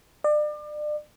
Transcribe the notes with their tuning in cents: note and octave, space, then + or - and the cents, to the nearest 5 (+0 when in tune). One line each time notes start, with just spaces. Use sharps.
D5 +35